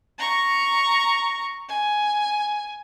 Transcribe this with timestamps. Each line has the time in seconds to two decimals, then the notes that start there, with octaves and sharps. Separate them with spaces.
0.18 A#5 C#6
1.69 G#5